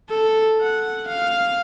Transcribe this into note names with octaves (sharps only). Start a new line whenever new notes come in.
A4
F#5
F5